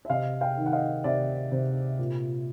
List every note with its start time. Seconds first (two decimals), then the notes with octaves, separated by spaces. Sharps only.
0.05 E5
0.10 C3 D#5 F5
0.41 F5 G5
0.57 D#3
0.66 F#5
0.73 D#5 F5
1.04 C3 D5 E5
1.52 C3
1.99 A#2